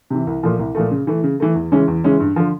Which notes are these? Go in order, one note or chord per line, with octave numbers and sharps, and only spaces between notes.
C3 E3
C2
A#2 F3 A3
C2
A#2 F3 A3
C#3
E3 A3
C#3
E3 A3
E2
C#3 E3 G#3 C#4
E2
C#3 E3 G#3 C#4
G2
D3 F3